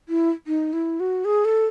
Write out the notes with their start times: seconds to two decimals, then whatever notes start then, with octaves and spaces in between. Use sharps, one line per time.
0.09 E4
0.47 D#4
0.73 E4
1.00 F#4
1.25 G#4
1.45 A4